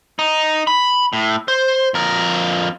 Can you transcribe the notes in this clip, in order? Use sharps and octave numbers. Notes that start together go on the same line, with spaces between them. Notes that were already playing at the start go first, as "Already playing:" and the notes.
D#4
B5
A2
C5
F2 A#4